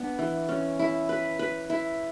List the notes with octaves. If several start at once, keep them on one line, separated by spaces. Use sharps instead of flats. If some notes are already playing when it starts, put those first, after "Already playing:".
Already playing: B3 D4
E3
C#4
E4
B4
B4
E4